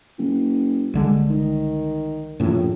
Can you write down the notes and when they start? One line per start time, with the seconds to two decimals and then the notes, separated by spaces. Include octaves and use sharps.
0.19 F#1
0.94 C2 D3 G#3
1.30 D#3
2.40 A#1 F#2 A2 E3